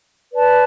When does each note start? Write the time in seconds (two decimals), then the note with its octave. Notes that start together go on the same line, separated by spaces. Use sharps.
0.33 B4 D5 A5